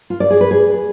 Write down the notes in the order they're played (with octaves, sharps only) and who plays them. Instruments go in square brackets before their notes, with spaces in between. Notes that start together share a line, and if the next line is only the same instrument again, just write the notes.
[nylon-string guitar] F4
D5
G#4
B4
G#4